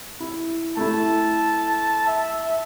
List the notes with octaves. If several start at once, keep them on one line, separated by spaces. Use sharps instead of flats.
E4
A3 E4 A5
E5